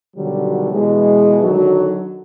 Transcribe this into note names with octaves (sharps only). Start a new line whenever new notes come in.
B2 D3 D#3 F#3 G3
B2 E3 G#3
D3 D#3 F#3